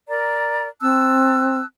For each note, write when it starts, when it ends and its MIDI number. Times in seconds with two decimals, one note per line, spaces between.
0.09 0.68 70
0.09 0.68 74
0.09 0.68 82
0.81 1.59 60
0.81 1.65 81
0.81 1.65 88
0.81 1.65 90